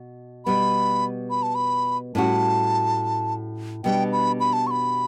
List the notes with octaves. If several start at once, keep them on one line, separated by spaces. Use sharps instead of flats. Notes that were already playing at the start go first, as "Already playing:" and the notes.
Already playing: B2
B2 G3 B3 B5
B5
A5
B5
A2 G3 C#4 F#4 A5
B2 G3 B3 D4 G5
B5
B5
A5
C#6
B5